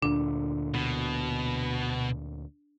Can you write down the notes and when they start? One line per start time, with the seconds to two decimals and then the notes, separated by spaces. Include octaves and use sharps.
0.02 D2 A#2 D3 D4
0.74 B2